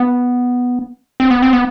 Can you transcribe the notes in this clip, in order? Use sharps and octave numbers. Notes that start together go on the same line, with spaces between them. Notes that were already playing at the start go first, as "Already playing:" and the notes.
Already playing: B3
C4
B3
C4
B3